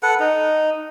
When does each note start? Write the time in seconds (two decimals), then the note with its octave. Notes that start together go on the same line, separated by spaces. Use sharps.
0.03 A4 B4 F#5
0.20 D#4